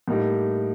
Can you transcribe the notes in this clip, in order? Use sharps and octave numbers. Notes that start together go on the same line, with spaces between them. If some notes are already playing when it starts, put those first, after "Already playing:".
A2 G3 A#3 D#4 G4